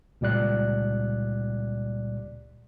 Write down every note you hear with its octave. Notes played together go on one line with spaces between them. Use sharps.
C#2 A#2 G3 D5 F#6